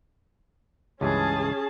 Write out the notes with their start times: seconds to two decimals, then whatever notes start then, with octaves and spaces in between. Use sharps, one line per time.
1.01 C#2 G2 E3 C#4 G#4 A5